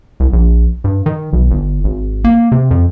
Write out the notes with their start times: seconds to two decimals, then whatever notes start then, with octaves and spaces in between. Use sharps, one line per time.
0.20 C2
0.33 A#1
0.84 G2
1.06 D#3
1.33 B1
1.51 G1
1.84 G#1
2.25 A#3
2.52 C3
2.71 F2